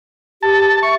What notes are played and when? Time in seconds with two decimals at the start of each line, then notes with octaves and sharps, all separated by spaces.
0.43 G4 A5
0.83 E5 C#6